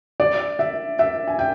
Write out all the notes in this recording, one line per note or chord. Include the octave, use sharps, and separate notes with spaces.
D5
E5
E5
G#5
G5